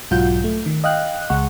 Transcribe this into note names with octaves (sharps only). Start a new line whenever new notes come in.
B1 G#2 F#3 F4 F#5 G6
A3
D#3
D#5 F5 G5 F#6
C#2 G#3 F#5 C#6